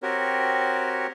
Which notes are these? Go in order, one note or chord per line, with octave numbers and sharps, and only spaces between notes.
C4 F#4 G4 A#4 C#5